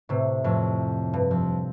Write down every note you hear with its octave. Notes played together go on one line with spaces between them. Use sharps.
A2 C3
F2 A2
G2
F2